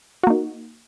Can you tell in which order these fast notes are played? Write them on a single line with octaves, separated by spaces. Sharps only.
F#4 A#3 D#4